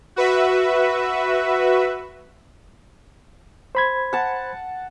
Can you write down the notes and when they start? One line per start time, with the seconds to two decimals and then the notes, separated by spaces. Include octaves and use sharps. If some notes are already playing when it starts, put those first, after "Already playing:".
0.16 F#4 B4 E5
3.75 C5 B5 G#6
4.13 F#5 A5